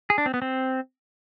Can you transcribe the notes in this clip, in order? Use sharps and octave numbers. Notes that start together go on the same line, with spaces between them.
G#4
D4
C4
B3
C4